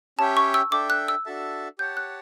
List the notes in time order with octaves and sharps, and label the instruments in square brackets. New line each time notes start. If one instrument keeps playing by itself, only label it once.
[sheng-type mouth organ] C#4 G4 C#5 E5 G5 [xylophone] A5
[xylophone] C#6
E6
[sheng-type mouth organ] D4 A4 E5 G5 [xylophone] D6
[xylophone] F#6
E6
[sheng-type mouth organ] D4 F#4 A4 E5 A5
[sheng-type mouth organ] G4 C#5 F#5 A5 [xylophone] G6
[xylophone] F#6